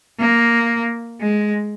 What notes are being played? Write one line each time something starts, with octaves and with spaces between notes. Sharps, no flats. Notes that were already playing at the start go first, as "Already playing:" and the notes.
A#3
G#3